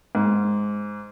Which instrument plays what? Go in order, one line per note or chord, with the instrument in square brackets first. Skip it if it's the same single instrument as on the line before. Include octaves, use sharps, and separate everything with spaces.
[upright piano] G#2